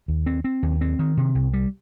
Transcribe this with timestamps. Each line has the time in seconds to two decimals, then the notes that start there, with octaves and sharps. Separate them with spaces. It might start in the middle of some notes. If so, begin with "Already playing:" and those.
0.08 D#2
0.26 C4
0.44 C4
0.63 D#2
0.81 C4
0.99 D#3
1.17 C3
1.35 C2
1.53 G3